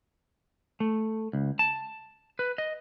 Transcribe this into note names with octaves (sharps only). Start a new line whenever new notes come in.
A3
C#2
A5
B4
D#5